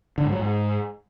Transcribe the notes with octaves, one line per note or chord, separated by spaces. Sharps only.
D3
G#2
F#3
G#2